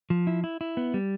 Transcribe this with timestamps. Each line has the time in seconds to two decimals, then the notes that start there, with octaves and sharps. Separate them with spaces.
0.10 F3
0.27 E4
0.44 E4
0.61 E4
0.77 B3
0.94 G3